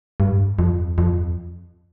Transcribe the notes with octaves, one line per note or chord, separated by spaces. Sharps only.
G2
F2
F2